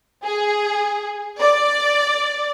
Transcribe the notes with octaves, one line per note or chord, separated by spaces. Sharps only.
G#4
D5